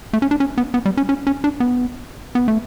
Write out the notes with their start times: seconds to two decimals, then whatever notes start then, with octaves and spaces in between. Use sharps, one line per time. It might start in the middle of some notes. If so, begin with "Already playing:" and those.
0.13 A3
0.22 C#4
0.31 D4
0.40 C#4
0.58 B3
0.74 B3
0.86 G3
0.97 C#4
1.09 C#4
1.27 C#4
1.44 D4
1.60 B3
2.35 B3
2.48 A3